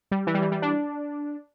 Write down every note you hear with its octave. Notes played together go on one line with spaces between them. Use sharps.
G3
E3
G3
E3
G3
D4